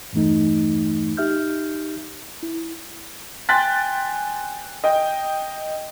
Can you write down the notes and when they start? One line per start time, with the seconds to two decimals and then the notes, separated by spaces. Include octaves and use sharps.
0.13 E2 G2 E3 A3 D#4
1.17 D#4 G4 E5 F6 G6
2.43 E4
3.49 G5 G#5 C6 F#6 A6 B6
4.84 D#5 G5